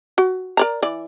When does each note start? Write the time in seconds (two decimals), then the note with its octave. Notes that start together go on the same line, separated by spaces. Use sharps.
0.18 F#4
0.57 A#4 D5 A#5
0.82 E3 D5